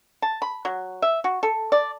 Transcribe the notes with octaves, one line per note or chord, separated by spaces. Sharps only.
A5
B5
F#3
E5
F#4
A4
D5